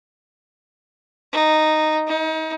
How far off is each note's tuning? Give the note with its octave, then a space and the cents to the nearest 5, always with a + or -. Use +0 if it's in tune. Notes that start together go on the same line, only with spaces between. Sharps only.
D#4 -5
D#4 +35